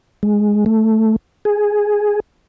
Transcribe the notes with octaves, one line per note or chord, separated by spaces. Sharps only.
G#3
A3
G#4